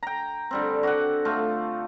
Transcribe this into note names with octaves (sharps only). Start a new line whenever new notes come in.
G5 A#5
D3 G3 C4
F#4 G4 F#5
A3 F4